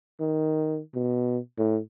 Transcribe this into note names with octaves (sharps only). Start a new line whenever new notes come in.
D#3
B2
A2